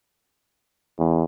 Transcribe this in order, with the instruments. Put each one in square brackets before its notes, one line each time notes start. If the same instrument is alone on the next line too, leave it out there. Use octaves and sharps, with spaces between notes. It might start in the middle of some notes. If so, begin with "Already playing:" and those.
[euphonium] E2